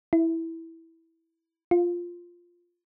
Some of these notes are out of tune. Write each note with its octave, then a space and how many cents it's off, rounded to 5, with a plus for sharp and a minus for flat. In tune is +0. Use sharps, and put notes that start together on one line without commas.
E4 -5
F4 +0